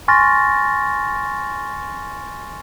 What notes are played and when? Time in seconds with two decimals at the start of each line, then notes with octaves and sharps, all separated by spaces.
0.08 G#5 C6 C#6 F6 A6 A#6